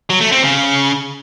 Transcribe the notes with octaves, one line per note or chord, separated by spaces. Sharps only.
F#3
A3
C4
C#3